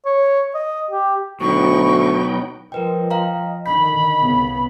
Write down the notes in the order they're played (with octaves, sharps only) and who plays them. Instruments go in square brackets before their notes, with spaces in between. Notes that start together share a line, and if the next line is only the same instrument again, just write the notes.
[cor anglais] C#5
D#5
G4
[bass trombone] D2 [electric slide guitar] B2 [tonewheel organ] F#3 D#4 G5 [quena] C#6
[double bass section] F3 [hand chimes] A#4 B4 G5 [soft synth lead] D#5
[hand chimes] F5 G5 A#5
[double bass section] D3 D#3 [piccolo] B5 [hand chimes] G6 B6
[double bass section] C2 C#3 B3